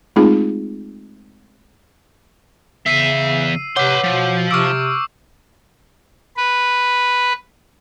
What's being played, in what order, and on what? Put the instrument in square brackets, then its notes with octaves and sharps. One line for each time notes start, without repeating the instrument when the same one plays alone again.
[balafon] G#3 A3 C4 D#4 F4 G#4
[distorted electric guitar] E2 E5 [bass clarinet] C#3 [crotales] E6 C7 D#7
[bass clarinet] C3 [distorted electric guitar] B4 C6 [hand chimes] C#5 F#5 D6 [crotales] G6
[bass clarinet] B2 [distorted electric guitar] F3
[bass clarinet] C3 [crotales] C#6 D6 E6 [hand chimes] F6 D7
[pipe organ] B4